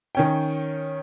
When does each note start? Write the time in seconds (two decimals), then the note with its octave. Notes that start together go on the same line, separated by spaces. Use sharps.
0.15 D#3 C#4 G5